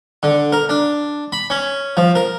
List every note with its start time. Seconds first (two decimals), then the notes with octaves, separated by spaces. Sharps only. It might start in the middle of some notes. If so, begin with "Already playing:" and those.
0.23 D3
0.52 A#4
0.69 D4
1.32 B5
1.50 C#4
1.97 F3
2.15 A#4